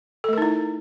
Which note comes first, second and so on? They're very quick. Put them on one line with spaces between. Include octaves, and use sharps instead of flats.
A4 A3 A#4 D#4 E4